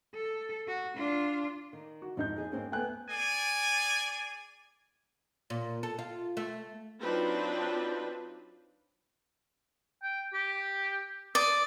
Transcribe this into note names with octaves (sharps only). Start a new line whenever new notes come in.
A4
F#4
D4 F4
D#3
F#4
F2 G#2 D#4 G6
D#2 G#4
G#2 A#3 C4 C#4
A3 B3 G5 G#5 F#6
G#4 D5 G#5
A#2
A4
F4
A3
F#3 C4 D4 D#4 F4 B4
G5
G4
D5 D#6